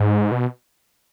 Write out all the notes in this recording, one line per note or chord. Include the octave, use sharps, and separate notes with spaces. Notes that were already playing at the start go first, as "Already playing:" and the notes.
Already playing: G#2
B2